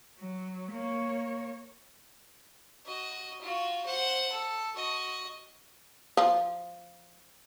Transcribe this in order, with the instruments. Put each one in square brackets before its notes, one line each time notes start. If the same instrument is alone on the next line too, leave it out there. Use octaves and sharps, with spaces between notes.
[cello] F#3
A#3 C#5
[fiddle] F#4 D#5
F4 F#4
C5 F#5
A4
F#4 D#5
[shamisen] F3